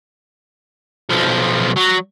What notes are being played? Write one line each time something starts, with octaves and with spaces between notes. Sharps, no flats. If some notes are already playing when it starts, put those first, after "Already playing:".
B1 F3
F#3